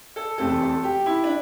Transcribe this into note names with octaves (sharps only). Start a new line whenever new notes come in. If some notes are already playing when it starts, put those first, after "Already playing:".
A4
E2 C3 A3 C4 A4
A4
G4
E4
D4